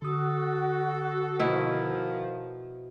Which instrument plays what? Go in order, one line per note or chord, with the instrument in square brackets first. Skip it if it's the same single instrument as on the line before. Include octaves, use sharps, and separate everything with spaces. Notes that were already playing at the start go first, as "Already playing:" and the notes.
[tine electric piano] D3 D#6 [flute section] F#4 [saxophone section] A4
[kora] B2 E4 [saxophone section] D#3 F3